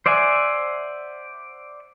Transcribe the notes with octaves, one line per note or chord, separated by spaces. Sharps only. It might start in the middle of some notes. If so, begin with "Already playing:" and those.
C5 D5 E5 F#5 G#5